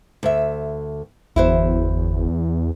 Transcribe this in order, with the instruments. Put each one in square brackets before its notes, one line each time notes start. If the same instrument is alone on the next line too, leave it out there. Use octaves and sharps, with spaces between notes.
[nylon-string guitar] D2 E5
[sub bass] G1 [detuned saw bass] E2 [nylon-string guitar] E4 F#4 C5